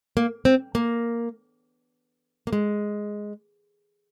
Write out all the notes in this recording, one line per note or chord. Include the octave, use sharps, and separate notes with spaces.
A#3
C4
A#3
A#3
G#3